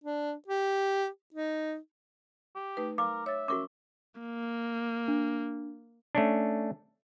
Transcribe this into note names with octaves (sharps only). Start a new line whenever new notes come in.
D4
G4
D#4
G4
A3 D#4 B4
A#4 F5 D6
C#5 E5 A6
C#4 F#4 A#4 C#6 D6
A#3
D4
A3 C#4 D4